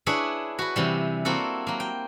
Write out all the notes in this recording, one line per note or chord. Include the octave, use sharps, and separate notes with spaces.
D4 E4 G#4 B4 C#5
F#4 B4
C3 E3 G3
A#3 C4 E4 F#4 A4
F#3 A#3
G5